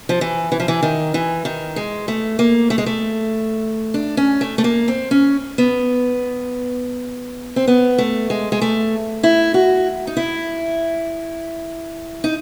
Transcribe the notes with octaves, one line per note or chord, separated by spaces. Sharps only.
F3
E3
E3
F3
E3
D#3
E3
D#3
G#3
A3
A#3
A3
G#3
A3
D4
C#4
A3
A3
A#3
C4
C#4
B3
C4
B3
A3
G#3
G#3
A3
E4
F#4
D#4
E4
D#4